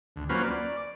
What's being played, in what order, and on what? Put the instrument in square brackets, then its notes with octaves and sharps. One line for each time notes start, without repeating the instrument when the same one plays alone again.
[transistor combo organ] D2
F#3 A#3 C#4 F4 B4 C5
D5